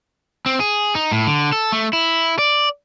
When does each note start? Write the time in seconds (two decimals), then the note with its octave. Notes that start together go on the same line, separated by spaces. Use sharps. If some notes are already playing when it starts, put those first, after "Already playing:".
0.46 C4
0.60 G#4
0.95 D#4
1.12 A2
1.27 D3
1.52 A4
1.72 A3
1.93 E4
2.39 D5